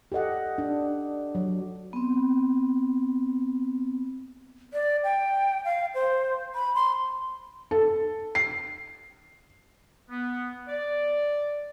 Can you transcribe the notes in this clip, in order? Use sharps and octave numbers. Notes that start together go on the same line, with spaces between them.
G4 A4 D#5 F#5
D4
F#3
B3 C4
D5
G5
F5
C5
B5
C6
A4
C7
B3
D5